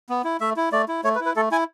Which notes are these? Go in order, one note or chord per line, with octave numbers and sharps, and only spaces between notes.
B3
E4
A3 E5
E4
A3 D5
E4
A3 C#5
B4
E4
B4
A3 A4
E4 G#5